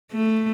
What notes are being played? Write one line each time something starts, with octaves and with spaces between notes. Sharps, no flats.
A3